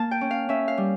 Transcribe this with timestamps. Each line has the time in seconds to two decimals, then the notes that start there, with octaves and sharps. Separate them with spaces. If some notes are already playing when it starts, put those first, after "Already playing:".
Already playing: A#3 A5
0.11 G5
0.21 C#4
0.31 F5
0.49 C#4 E5
0.68 F5
0.77 G3